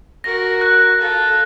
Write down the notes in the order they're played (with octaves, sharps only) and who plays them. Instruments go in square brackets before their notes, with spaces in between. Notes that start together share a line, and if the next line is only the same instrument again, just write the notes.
[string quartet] F#4 A#4 [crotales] A#6
[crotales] F#6
[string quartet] F4 A4 [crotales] A#6